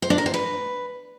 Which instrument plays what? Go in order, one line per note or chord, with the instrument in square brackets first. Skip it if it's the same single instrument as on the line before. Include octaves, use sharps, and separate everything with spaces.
[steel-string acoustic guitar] C5
D4
A#4
C5
B4